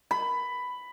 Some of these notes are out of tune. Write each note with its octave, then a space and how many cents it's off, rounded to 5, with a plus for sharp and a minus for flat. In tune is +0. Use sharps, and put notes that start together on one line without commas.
B5 +10